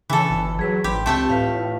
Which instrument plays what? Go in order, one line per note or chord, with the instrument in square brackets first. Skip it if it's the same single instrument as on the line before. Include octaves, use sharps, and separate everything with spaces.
[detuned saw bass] C#3 [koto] E3 A4
[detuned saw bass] G1
[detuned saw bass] F#3 [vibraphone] G#4 B4
[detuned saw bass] G#1 [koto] G4 [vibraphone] B5 C6 D6
[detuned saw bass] C#2 [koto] A3 G5 A5 [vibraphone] C4 G4
[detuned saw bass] A2 [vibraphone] F4 B4 F5